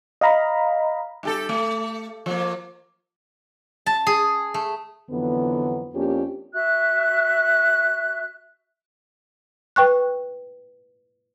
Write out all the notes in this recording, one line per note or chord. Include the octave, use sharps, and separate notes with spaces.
D#5 F5 A#5 B5
G2 G4 A4
A3
F3 A#3
A5
G#4
A3
F2 D3 E3 F#3 B3
F2 A#3 C#4 D4 F4 G4
F#4 E5 F#6
B4 G5 C#6 F#6